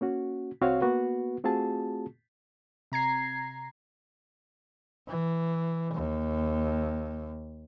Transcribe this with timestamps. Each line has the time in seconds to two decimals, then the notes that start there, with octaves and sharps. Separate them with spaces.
0.01 A#3 C#4 F#4
0.61 C2 C4 F#4 C#5 F5
0.81 A#3 B3 F#4 B4
1.44 A3 C4 F4 F#4 G#4 A5
2.92 C3 A#5 G#6 C7
5.08 E3
5.94 D#2